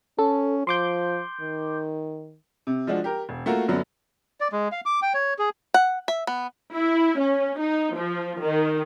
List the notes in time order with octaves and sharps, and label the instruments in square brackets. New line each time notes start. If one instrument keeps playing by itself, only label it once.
[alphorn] C#4 [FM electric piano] A4
[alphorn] F3 [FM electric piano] C6 D6 G6
[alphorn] D#3
[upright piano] C3
F3 G#3 D4 F#4
G4 A#4
E1
A3 A#3 F4 F#4 A#4
F#2 D3 F#3 B3 D4
[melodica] D5
G#3
F5
D6
G5
C#5
G#4
[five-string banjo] F#5
E5
B3
[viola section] E4
C#4
D#4
F3
D#3